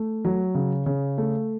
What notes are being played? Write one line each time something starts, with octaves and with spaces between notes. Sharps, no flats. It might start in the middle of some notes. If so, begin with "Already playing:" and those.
Already playing: A3
F#3
C#3
C#3
A3